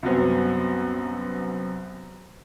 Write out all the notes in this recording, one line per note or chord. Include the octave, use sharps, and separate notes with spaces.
C2 F#2 F#3 B3 C4